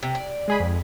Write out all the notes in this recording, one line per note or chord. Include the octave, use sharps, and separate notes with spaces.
C3
D5
G#3 G#4 B5
F2